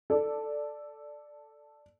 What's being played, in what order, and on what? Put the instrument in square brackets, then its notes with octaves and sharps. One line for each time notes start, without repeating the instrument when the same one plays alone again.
[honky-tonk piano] A4 D5